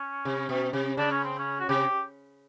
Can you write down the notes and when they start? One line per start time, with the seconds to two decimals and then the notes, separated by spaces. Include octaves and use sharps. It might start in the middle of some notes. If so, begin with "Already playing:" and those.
Already playing: C#4
0.25 C3
0.49 B2
0.73 C3
0.97 C#3 D4
1.11 C#4
1.24 C4
1.39 C#4
1.60 F#4
1.69 C3 G4